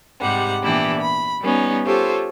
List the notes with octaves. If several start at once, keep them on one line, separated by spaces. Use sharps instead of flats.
G#2 C3 G3 F#5
A#2 E3 B3 D4 E4 G4
B5
G3 B3 C#4 D#4
F4 G4 A4 C5 C#5